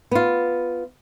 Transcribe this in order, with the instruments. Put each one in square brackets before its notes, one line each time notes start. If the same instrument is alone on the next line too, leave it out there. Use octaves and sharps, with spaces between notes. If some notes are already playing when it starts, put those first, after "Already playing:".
[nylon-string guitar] B3 F4